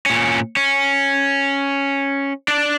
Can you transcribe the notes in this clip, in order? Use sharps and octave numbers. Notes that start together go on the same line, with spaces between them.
A#2 C#4
C#4
D4 D5